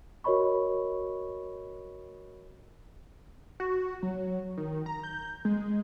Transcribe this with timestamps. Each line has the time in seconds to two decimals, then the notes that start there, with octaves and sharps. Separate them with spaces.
0.24 F#4 A#4 C#5 D#5 B5 C#6
3.60 F#4
4.03 F#3
4.57 D#3
4.86 A#5
5.03 G6
5.45 G#3